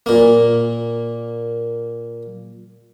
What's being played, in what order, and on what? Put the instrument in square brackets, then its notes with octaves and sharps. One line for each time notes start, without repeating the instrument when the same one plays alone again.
[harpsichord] A#2 A#3